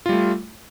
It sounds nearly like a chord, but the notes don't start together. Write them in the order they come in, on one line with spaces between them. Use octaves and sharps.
F4 G3 A3